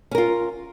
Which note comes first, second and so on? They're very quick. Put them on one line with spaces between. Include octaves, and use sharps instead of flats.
C#4 A#4 F4